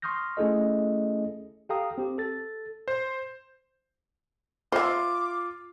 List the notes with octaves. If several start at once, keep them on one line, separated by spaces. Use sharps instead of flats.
C6 C#6 D#6 F6 G6 A#6
A3 C#4 E4 G#4 A4 D#5
G4 A4 F5 G5 A#5 D#6
C4 G4
A4 A6
C5
F4 C5 E5 D6 F6 C7